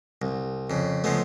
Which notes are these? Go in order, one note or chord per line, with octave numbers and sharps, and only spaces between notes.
C2
F2 C#3
C#3 F3 G#3 A3 B3